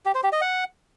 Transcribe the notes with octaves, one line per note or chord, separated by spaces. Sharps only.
G4
C5
G4
D#5
F#5